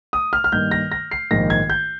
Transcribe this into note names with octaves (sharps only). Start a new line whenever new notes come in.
D#6
F6
F6
G2 D#3 A#3 G6
A#6
A#6
C7
A#1 G#2 D#3 A#3 A#6
G#6
G6